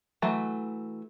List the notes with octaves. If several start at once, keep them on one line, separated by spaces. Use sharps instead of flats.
E3 F#3 A3